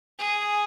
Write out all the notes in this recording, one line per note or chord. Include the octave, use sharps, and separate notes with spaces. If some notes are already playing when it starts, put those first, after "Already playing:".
G#4